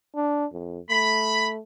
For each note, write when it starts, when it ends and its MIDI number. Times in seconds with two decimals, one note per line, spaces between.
0.15 0.45 62
0.53 0.79 41
0.90 1.60 57
0.90 1.47 83